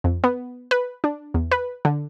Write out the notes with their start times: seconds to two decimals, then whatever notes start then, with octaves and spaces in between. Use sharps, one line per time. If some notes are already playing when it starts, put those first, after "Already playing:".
0.04 F2
0.24 B3
0.71 B4
1.04 D4
1.34 E2
1.52 B4
1.85 D3